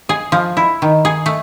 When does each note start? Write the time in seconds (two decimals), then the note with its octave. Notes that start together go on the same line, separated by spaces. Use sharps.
0.09 G#4
0.32 F3
0.57 E4
0.82 D#3
1.05 G#4
1.26 A3